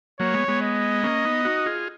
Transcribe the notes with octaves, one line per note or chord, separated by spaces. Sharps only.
F#3 A#3 C#5
G#3 B3
G#3 B3
D#5
A#3 C#4
B3 D#4
D#4 F#4
F4 G#4